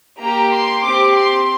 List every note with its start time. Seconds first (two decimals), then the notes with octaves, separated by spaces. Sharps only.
0.21 A#3 G4 A#5
0.53 C6
0.85 C4 G4 D6
1.16 C6